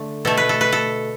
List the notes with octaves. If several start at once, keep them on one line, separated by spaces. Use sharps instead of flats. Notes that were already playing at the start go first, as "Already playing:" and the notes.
Already playing: D3 A3
B2 A3 A4
B4
A4
B4
A4